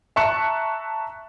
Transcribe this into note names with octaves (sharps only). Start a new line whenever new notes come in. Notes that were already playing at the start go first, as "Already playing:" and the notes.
E5 A5 A#5 C#6 F#6 C#7